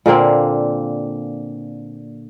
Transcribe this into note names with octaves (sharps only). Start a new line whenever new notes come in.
A#2 D3 A#3 C4